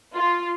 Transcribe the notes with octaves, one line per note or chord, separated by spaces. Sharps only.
F4